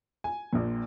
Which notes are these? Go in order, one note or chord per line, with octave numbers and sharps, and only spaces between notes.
G#5
A#1 A#2